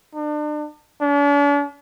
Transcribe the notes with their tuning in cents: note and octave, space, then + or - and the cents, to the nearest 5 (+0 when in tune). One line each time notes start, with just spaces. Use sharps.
D4 +35
D4 -45